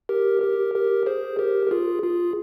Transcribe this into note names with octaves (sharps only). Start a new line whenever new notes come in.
G4 A#4
G4 A#4
G4 A#4
G#4 C5
G4 A#4
A#4
F4 G#4
F4 G#4